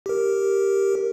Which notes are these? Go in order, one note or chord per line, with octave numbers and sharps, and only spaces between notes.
G4 A#4